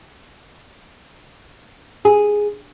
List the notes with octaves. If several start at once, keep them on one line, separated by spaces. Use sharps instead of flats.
G#4